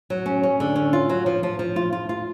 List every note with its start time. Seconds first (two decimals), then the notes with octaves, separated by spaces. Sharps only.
0.10 F#3
0.26 C#4
0.43 C#4
0.60 D3
0.76 C#4
0.93 F4
1.09 F#3
1.26 F3
1.43 F3
1.59 F3
1.76 F4
1.92 F4
2.09 F4